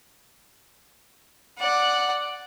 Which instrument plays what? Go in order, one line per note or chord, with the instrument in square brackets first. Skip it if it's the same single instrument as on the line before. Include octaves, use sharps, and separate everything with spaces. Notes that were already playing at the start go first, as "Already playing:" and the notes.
[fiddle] D5 F#5